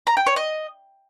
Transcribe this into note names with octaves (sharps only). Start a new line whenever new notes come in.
A#5
G5
C#5
D#5